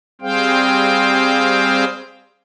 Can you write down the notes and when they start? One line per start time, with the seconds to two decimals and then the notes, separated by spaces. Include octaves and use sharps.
0.21 G3 C4 G#4 C5 F5 G5